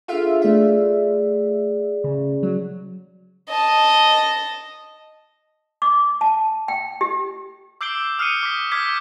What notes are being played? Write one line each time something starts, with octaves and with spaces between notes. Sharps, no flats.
D4 F4 G#4 A4 E5 F5
A3 G#4 D5 E5
C#3
F#3
D#5 A5
D6
A5
G5
G4
D6 E6 G6 C7 D7 G7
D#6 F6 F#6 C7 C#7 D#7
D6 B6
D6 F6 G6 G#6 B6